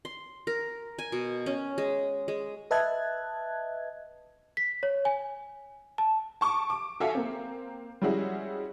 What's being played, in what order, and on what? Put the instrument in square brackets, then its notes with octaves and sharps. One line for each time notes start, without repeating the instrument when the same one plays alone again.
[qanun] C6
A#4
G#5
B2
C#4
G#3
G#3
[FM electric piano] B4 D#5 E5 A5 F#6 G#6
[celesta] B6
C#5
G#5
A5
[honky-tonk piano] A5 C#6 D6
D6
F#4 A4 E5 F5 G#5
A#3 C4
G3 G#3 C#4 E4 F#4 G#4